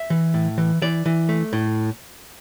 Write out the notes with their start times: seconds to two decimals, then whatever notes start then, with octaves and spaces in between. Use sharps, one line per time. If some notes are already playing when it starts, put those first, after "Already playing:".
Already playing: E5
0.10 E3
0.34 A2
0.58 E3
0.82 E3 D5
1.06 E3
1.29 A3
1.53 A2